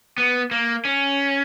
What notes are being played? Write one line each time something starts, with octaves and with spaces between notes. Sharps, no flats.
B3
A#3
C#4